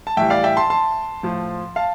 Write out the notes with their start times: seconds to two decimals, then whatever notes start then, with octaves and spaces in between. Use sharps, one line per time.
0.07 A5
0.17 A2 E3 G3 E5 G5
0.30 D5 F5
0.44 E5 G5
0.57 A5 C6
0.70 A5 C6
1.23 A2 F3
1.76 F5 A5